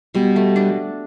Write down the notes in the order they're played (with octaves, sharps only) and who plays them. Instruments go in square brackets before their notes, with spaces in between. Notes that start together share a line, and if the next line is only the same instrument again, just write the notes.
[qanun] B2 [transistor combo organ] G3
[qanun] A3
D4